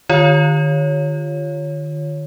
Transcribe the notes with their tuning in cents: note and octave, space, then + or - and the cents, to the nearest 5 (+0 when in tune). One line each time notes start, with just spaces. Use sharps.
D#3 -45 F4 +0 C#5 +0